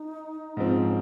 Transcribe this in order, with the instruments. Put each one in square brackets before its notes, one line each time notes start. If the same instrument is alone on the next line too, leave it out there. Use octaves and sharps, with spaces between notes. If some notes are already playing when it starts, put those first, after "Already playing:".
Already playing: [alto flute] D#4
[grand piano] G#2 F3 C4 [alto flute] C#4